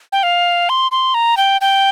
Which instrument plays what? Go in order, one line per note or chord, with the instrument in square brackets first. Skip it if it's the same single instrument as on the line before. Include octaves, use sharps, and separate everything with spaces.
[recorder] G5
F5
C6
C6
A#5
G5
G5